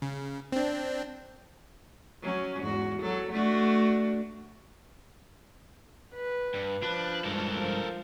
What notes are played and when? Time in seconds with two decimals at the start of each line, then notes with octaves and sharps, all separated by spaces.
0.02 C#3
0.52 C4 D4
2.22 F#3 C#4
2.62 E2 G#2 F#4
3.00 F#3 A4
3.31 A3 D4 F#4
6.15 B4
6.54 G2
6.83 F3 D4 B4
7.24 G2 G#3 A4 A#4
7.57 F3